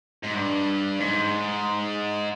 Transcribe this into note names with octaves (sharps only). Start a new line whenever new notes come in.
G#2
G2
G#2